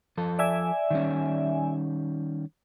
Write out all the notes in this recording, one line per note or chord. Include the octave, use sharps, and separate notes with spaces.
F3 A4
D5 E5 G#5
D#3 G3 C#4